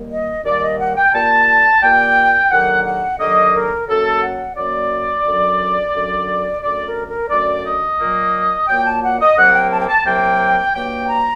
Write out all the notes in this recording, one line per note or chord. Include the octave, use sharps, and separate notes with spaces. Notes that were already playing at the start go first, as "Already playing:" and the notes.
Already playing: D#2 D#3 G3 A#3
D#5
D#2 D#3 G3 A#3 D5
D#5
F#5
G5
A#2 G3 A#3 A5
A#2 G3 A#3 G5
D#2 D3 F#3 A#3 F#5
F#5
D#2 D3 F#3 A#3 D#5
A#4
F#2 F#3 A#3 A4
F#5
F#2 F#3 A#3 D5
F#2 D3 F#3
F#2 D3 F#3
F#2 D3 A3 D5
A#4
A#4
F#2 D3 A3 D5
D#5
A#2 F#3 A#3
A#2 F#3 A#3 G5
A5
F#5
D#5
C2 C3 F#3 A#3 F#5
G5
A5
G5
A5
C2 C3 F#3 A#3 G5
G2 F#3 A#3 G5
A#5